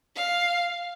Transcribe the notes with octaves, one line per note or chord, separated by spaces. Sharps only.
F5